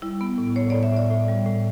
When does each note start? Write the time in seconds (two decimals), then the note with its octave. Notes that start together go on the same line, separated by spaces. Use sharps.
0.02 G3 E4
0.21 B3
0.38 A2
0.56 A2 C#5
0.70 A2 D5
0.83 E5
0.92 A2 D5
1.10 A2
1.28 G3
1.46 A2